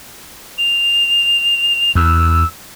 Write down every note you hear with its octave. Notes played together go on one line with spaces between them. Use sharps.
F7
E2 E6